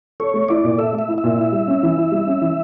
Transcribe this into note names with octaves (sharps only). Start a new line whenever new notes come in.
A4 C#5
A3
E4 D5
A#2
A4 E5
A3
E5
E4
E5
A#2
E4
G3
C#4
E3
E4
G3
C#4
E3